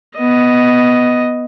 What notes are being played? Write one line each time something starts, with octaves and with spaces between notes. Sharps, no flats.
B3 D#5